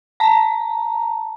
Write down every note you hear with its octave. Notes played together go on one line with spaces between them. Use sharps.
A5 A#5